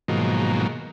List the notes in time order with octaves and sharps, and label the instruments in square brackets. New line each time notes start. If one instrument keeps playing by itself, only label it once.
[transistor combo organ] G#2 B2 D#3 F3 F#3 A#3